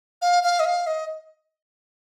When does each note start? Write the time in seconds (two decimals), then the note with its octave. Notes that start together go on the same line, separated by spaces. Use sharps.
0.22 F5
0.43 F5
0.60 D#5
0.65 F5
0.87 D#5